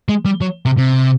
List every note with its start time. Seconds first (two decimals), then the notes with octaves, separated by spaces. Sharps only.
0.09 G#3
0.25 G3
0.41 F#3
0.65 C3
0.78 C3